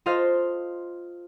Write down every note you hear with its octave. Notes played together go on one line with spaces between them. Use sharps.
F4 A4 C5 D#5 F5